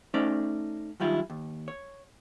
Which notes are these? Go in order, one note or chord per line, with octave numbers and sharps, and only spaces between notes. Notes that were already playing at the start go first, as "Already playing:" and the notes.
A3 C#4 D#4 C5 D5
F#2 D#3 G3 E4 F4
D#2
C#5